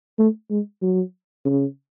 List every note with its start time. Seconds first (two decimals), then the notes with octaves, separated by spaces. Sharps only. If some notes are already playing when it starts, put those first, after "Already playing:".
0.18 A3
0.50 G#3
0.82 F#3
1.45 C#3